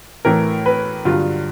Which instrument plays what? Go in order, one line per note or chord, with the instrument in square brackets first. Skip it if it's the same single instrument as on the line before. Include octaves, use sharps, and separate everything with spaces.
[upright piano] A2 E3 A3 A#4
B4
G2 D3 F#3 F4